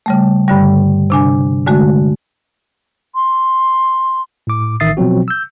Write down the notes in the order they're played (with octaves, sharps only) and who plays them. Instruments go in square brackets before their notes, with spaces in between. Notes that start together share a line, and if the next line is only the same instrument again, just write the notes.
[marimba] C#3 G3 A3
G2 D3 G3
C3 D4 G#5
D3 G#3 A3 F#4
[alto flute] C6
[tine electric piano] A2 D6
A1 D#3 E5 D#6 A6 C7
B2 F3 F#3 C4 F#4
E6 G6